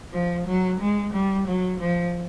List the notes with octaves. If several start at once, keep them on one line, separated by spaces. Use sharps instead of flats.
F3
F#3
G#3
G3
F#3
F3